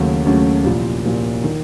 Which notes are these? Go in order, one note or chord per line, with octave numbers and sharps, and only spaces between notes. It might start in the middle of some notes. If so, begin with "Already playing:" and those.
Already playing: D#2 C#3 F#3 A3 C#4
D#2 C#3 F#3 A3 C#4
C2 A#2 F3
C2 A#2 F3
D#3